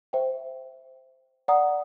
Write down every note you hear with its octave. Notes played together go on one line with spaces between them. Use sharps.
C5 E5 G5
D5 F#5 A#5 D#6